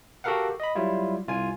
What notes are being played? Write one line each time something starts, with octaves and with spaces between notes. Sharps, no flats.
F#4 G4 A4 A#4 F5 F#5
D#5 B5
F#3 G3 E4 F4
C2 F4 G#5